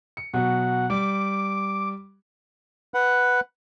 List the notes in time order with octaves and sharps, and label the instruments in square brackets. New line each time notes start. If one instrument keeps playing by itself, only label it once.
[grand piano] C#7
[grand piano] B2 F#3 F#4 [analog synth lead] F#5
[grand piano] G3 [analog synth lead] D6
[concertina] B4 F#5